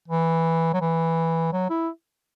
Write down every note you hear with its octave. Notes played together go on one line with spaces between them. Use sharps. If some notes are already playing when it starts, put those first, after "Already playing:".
E3
F#3
E3
F#3
E4